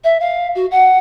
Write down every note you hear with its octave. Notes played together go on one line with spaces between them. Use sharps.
E5
F5
F#4
F#5